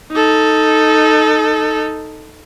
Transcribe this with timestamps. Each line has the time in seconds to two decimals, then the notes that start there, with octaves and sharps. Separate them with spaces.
0.12 D#4 A4